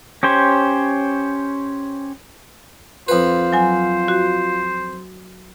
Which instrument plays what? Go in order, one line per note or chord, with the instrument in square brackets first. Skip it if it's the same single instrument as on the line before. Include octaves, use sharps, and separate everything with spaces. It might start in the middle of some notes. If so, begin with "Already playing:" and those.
[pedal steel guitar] C#4 G4 C5 C#5
[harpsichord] F2 B4 [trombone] F4 [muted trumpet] C5
[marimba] F#3 G#5
F#4